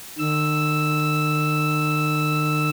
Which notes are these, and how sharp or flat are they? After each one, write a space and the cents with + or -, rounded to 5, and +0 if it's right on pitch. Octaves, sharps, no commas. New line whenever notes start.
D#3 -45 E6 +0